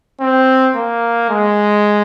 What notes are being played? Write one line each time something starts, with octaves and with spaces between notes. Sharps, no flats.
C4
A#3
G#3